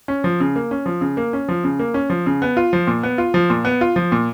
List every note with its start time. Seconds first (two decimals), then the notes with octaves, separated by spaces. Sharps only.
0.08 C#4
0.24 F3
0.40 C#3
0.56 A#3
0.71 C#4
0.86 F3
1.01 C#3
1.17 A#3
1.33 C#4
1.49 F3
1.64 C#3
1.79 A#3
1.94 C#4
2.10 F3
2.26 C#3
2.42 B3
2.57 F4
2.73 F3
2.87 A#2
3.03 B3
3.18 F4
3.34 F3
3.50 A#2
3.65 B3
3.81 F4
3.96 F3
4.12 A#2